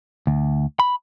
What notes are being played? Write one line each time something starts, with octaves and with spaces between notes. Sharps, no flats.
D2
B5